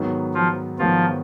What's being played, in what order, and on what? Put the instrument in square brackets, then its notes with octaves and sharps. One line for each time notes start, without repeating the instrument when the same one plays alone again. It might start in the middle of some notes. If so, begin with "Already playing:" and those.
Already playing: [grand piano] G#2 D#3 F#3 B3
[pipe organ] F3 F4
[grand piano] G#2 D#3 F#3 B3 [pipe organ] F3 F4